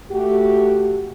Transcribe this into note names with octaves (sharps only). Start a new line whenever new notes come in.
A3 F#4 G4